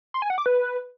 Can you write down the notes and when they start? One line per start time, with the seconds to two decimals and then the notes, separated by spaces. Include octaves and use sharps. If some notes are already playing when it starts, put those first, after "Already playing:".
0.14 C6
0.22 G#5
0.30 F#5
0.38 D6
0.46 B4